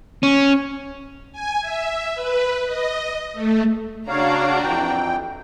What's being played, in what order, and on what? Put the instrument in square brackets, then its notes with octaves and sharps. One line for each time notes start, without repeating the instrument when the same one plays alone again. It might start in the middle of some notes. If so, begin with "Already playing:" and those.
[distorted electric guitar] C#4
[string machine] G#5
E5
B4
D#5
A3
[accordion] C#3 C#5 F5 [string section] D4 F#4 A#5
[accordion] F2 E3 G5